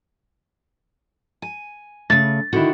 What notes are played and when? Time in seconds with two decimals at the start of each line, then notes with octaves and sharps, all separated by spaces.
1.42 G#5
2.10 C#3 A3 A6
2.53 D3 D#3 E4 F#4